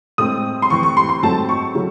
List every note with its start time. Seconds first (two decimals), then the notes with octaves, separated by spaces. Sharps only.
0.18 A2 G#3 C4 D#6
0.62 C6
0.70 A2 E3 C4 C#6
0.83 C#6
0.97 C6
1.09 C6
1.23 G#2 F#3 A3 C4 A5
1.49 C#6
1.75 C#3 F#3 A3